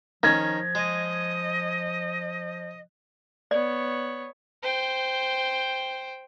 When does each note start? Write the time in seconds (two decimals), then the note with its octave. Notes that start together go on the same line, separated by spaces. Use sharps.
0.23 D#3 F3 C#4 G#6 A#6
0.75 G#3 D#5
3.51 B3 C#5 D5
4.63 C5 G5